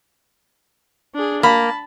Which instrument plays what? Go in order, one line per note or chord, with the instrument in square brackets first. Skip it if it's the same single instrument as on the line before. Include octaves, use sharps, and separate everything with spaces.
[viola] D4 G#4
[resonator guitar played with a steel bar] A#3 [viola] A5 [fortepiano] B5